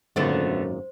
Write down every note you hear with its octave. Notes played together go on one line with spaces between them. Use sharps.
G#1 F#2 A#2 D3 A3 B3 C5